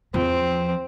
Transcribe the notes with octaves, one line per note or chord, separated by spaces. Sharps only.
E2 F3 C4